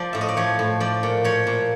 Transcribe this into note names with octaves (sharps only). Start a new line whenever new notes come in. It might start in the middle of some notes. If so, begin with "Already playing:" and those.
Already playing: F3 D5
A2 E5
D#5
D5
F3 C#5
A2
F3 D5
A#2
F3 C#5
A#2